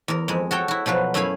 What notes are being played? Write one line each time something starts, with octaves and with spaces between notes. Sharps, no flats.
E2 A#4
F2 G#3
F#4 A4 C#5 G5
E4 F#4
B2 F3 F#3 B4
F#2 A3 E4 F5 G#5 B5